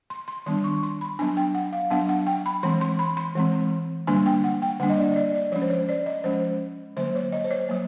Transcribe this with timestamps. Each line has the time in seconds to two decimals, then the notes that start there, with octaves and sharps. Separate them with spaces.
0.10 C6
0.28 C6
0.46 D#3 G3 B3 D4 C6
0.64 C#6
0.83 C6
1.01 B5
1.19 F#3 B3 D4 G#5
1.37 G5
1.55 F#5
1.72 F5
1.90 F#3 B3 D4 F#5
2.09 F#5
2.27 G5
2.46 B5
2.63 E3 G#3 C4 C6
2.81 C6
2.99 B5
3.17 C6
3.35 E3 G#3 C4
4.07 D3 G3 A#3 D4 G#5
4.26 G5
4.44 F#5
4.62 G5
4.80 D3 G3 A#3 D4 F#5
4.89 D#5
4.98 D5
5.12 D#5
5.16 D5
5.34 D5
5.52 F3 G#3 C#4 C#5
5.62 C5
5.70 C#5
5.89 D5
6.06 D#5
6.24 F3 G#3 C#4 C5
6.97 D3 F#3 A#3 C5
7.15 C#5
7.32 D#5
7.44 C5
7.51 C#5
7.69 F#3 A#3